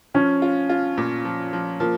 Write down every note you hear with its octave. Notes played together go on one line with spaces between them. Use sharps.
F3 C#4
F4
F4
A#2
F3
F3
F3 A#3